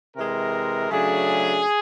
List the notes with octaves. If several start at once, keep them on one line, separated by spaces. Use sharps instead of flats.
C3 E3 G#3 A#4
C#3 F#3 A3 D4 G#4